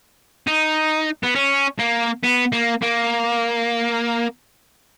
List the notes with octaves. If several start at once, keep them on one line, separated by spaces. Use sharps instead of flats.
D#4
B3
C#4
A#3
B3
A#3
A#3